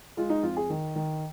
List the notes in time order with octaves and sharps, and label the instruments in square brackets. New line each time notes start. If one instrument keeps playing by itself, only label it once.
[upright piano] G#3 F4
D#4
F2 F4
G#4
D#3
D#3